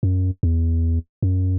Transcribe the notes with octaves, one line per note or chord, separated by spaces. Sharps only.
F#2
E2
F#2